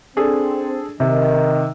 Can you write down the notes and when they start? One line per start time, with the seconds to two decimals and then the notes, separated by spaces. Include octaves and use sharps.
0.17 C4 D4 G#4 A4
1.00 C3 D#3